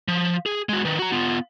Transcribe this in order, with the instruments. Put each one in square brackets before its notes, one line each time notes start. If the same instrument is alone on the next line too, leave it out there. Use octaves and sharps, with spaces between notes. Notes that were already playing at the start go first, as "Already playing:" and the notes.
[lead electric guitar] F3
G#4
G#3 F#4
D#3 B4
F#4 A#5
B3 F4